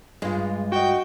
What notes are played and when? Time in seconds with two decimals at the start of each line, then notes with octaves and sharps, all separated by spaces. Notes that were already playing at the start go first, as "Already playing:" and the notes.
0.22 G2 G#3 F4
0.72 F#4 D#5 G5